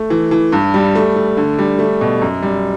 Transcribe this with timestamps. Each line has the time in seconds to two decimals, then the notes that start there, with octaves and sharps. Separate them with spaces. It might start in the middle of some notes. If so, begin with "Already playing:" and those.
Already playing: A3
0.10 E3
0.31 E3
0.52 G2
0.74 G3
0.95 A3
1.16 A3
1.37 D3
1.59 G3
1.79 A3
2.01 B2
2.22 F#2
2.43 G3